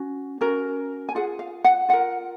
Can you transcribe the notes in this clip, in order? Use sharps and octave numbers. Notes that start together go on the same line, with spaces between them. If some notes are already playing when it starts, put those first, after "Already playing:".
Already playing: C#4 F#4
C#4 F#4 A#4
G#5
F4 G#4 F#5
F5
F#5
F4 A#4 F#5